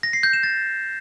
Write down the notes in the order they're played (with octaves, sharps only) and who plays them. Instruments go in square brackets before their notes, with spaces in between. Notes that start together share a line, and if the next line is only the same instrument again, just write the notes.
[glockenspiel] A#6
C7
G6
E7
A6